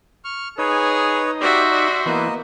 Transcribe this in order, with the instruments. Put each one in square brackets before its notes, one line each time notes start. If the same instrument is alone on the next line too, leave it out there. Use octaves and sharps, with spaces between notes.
[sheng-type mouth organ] C#6 F6
[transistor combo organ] D#4 [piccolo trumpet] G#4 [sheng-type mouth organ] B4 C#5
[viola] F#4 E5 [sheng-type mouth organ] G4 D5 C6 [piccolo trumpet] C5
[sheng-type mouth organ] D5
[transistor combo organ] E3 B3 [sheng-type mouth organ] A#3 D#5